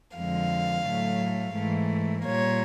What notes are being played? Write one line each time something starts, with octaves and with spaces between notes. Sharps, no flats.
F2 D3 F3 G#3 F5
A2 F#3 A3
G#2 E3 A3
A#2 G3 A#3 C#5